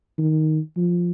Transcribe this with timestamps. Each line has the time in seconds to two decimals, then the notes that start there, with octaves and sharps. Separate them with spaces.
0.18 D#3
0.76 F3